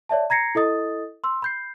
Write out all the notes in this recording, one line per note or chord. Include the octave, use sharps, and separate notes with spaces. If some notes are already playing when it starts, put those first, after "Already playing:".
C#5 D5 E5 A5
A#5 G#6 A#6 C7 C#7
E4 A4 D#5 D#6 A6
C6 E6
B5 G6 C7